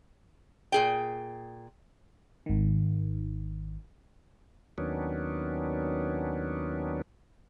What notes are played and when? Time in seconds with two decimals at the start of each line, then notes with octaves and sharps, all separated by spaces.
0.72 A#2 G#4 G5
2.46 G#1 D#3
4.78 D#2 D#3 F#3 B3 C#4 D4